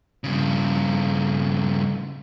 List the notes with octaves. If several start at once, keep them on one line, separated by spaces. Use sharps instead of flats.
G2 C#3